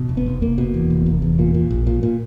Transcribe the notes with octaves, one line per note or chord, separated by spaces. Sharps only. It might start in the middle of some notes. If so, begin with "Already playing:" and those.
Already playing: B2
F1
B3
F1
F1 A#3
B2
E2
F1
F1
E2
A#2
A#2
A#1
A#2
A#2